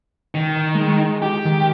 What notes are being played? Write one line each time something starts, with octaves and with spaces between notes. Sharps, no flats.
D#3
G#3
G4
D#3